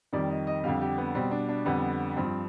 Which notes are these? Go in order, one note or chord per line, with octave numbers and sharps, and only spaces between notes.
F2 D#3 G3 D5
D#5
D#5
F2 D3 G3 F5
G4
B3
B2 G3 C4
D4
D4
F2 D3 G3 B3
G2 F3 C4